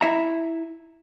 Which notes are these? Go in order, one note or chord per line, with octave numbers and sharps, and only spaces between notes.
E4 E5 A#5